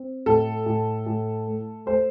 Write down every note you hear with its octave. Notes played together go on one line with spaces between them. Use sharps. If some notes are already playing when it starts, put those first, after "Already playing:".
Already playing: C4
A2 A4
A2
A2
A3
A3 C5